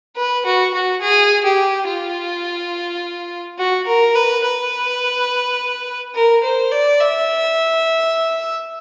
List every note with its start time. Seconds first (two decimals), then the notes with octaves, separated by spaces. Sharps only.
0.16 B4
0.45 F#4
0.73 F#4
1.01 G#4
1.45 G4
1.87 F4
3.59 F#4
3.86 A#4
4.15 B4
4.43 B4
6.14 A#4
6.43 C5
6.72 D5
7.00 E5